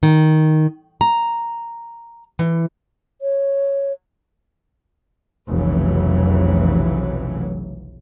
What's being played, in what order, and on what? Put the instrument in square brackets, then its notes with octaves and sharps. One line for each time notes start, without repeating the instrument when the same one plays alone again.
[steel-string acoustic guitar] D#3
A#5
E3
[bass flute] C#5
[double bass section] F1 B1 C#3 E3 F#3